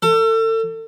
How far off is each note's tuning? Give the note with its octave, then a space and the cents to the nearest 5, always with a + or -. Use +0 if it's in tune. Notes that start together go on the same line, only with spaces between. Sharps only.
A4 +35